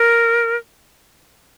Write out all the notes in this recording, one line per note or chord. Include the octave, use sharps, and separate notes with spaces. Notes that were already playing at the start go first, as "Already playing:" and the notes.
Already playing: A#4